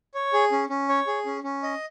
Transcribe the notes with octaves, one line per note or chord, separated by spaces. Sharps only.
C#5
G#4
C#4
C#4
C#5
G#4
C#4
C#4
D#5